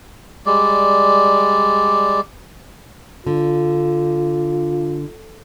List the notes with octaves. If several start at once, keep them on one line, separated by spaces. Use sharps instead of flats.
G3 G#3 D5
D3 F4